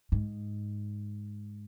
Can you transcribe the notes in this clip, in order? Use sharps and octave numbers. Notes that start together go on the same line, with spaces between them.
G#2